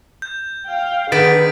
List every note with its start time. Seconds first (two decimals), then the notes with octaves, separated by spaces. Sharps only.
0.22 G6
0.68 F5 G5
1.12 D3 D#3 B3 G#4 B4 A6 B6 D7